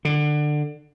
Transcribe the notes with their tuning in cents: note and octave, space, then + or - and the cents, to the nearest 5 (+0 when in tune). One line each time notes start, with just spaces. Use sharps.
D3 +20